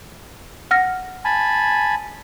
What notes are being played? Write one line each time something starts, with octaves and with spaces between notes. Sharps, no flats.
F#5 F6 A#6
G#5 A5 B5